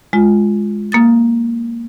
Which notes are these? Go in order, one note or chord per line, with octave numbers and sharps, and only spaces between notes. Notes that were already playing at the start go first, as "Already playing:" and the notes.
G#3 F4
A#3 D#6 A6